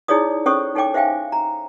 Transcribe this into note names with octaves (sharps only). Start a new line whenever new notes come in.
D#4 E4 G#4 C#5 D5 D#6
C#4 A4 C5 C#5 C#6 D#6
D#4 A4 C#5 G5 D6
C5 E5 F5 G5 G#5
A#5